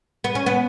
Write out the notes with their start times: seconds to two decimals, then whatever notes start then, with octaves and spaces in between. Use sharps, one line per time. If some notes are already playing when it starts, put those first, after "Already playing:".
0.24 B3
0.35 C#4
0.46 B3